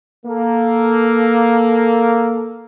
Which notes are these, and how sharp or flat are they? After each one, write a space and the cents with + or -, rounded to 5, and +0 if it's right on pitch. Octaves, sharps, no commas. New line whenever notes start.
A#3 +0 A4 +0